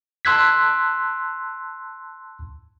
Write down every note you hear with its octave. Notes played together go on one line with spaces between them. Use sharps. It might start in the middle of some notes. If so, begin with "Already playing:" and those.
A5 C6 E6 F#6 G#6 B6